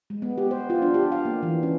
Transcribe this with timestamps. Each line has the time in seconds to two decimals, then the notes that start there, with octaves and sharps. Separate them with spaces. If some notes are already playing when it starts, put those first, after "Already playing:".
0.10 G#3
0.22 B3
0.38 G4
0.51 C5
0.70 F4
0.82 D4
0.94 G4
1.12 F5
1.25 A#3
1.43 E3
1.63 C#4